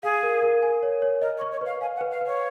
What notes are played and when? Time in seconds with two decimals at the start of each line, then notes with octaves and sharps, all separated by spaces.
0.03 G#4 F5
0.23 A#4
0.42 A#4
0.62 G#5
0.83 C#5
1.02 C#5
1.22 A#4 D#5
1.37 C#5
1.41 C#6
1.52 C#5
1.61 B4 F5
1.81 F5 G#5
1.96 F#5
2.01 B4
2.11 F5
2.21 B4
2.26 C#5